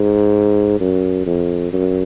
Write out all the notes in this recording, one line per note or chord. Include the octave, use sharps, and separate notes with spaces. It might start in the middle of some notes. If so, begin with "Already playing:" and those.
Already playing: G#2
F#2
F2
F#2